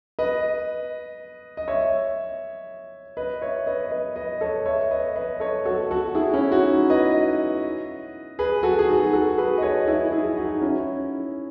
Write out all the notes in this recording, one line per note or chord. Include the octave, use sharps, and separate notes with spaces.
B4 D#5
D#5
C#5 E5
B4 D#5
C#5 E5
B4 D#5
B4 D#5
B4 D#5
A4 C#5
C#5 E5
B4 D#5
B4 D#5
A4 C#5
F#4 A4
F#4 A4
E4 G#4
C#4 E4
D#4 F#4
B4 D#5
G#4 B4
F#4 A4
G#4
D#4 F#4
F#4 A4
G#4 B4
D#5
A4 C#5
E4 G#4
E4 G#4
D#4 F#4
C#4 E4